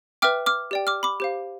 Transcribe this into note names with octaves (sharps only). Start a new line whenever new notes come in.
B4 E5 G5 D6 F6
D6 F6
G4 D5 G5
D6 F6
B5 D6
G4 C5 F5